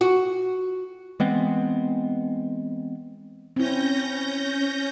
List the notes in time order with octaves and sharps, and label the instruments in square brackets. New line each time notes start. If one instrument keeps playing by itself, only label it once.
[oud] F#4
[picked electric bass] E3 G#3 B3 C4
[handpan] C4 E4 [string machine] C#4 G6 A#6